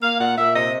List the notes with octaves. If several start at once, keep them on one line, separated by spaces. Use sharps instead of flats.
A#3 F5
A#2 F#5
A#2 E5
C3 D#5